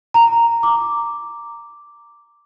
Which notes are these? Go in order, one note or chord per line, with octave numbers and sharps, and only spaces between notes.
A#5
D6